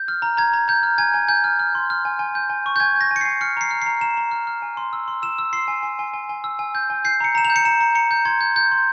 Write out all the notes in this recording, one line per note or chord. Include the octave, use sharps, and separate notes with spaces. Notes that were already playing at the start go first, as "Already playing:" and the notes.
Already playing: G6
F6
A#5
A#5 G#6
A#5
A#5 G6
F6
G#5 G#6
G#5
G#5 G6
F6
F6
C6
F6
G#5
G#5
G6
G#5
C#6
G6
G#5 G#6
G6 A#6
G#5
C#7
G#5 C7
F6 C#7
A#5 C7
F6
A#5 C7
A#5 E7
A#5
F6
F6
G#5
C6
E6
C6
E6 E7
E6
C6 C7
G#5
G#5
G#5
G#5
G#5
E6
G#5
G6
G#5
G6 C7
A#5 C#7
A#5 E7
F7
G6
C#7
A#5 E7
A#5
A#5 C#7
G6
C6 G#6
G6
G6
C6